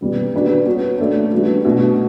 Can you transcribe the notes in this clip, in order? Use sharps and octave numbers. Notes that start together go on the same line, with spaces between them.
B2 G3 B3
G3 D4 F#4 B4 D5
B3 F#4 C#5
A3 D4 A4 D5
G3 B3 D4 F#4
B2 A3 D4 F#4